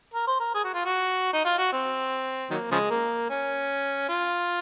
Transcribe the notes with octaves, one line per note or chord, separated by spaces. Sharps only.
A#4
C5
A#4
G#4
F#4
F4
F#4
D#4
F4
F#4
C4
D#3 F#3 A#3
C#3 F3 G#3
A#3
C#4
F4